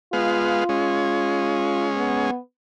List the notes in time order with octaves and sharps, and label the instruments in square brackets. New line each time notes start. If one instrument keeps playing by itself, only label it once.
[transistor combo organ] G#3 B3 F5 [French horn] F4
[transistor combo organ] G#3 C#4
[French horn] B3